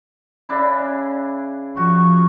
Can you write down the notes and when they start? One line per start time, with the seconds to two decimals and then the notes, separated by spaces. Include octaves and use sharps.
0.49 C#3 D4 E4
1.77 F3 F#4 C#6